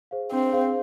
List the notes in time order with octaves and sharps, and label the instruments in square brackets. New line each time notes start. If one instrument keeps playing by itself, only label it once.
[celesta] G#4 C5 F5
[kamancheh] C4 [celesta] D4
[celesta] G#4 C5 F5